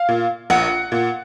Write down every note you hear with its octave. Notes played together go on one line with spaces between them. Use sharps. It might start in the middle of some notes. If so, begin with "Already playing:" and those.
Already playing: F5
A#2
A#1 F#5
A#2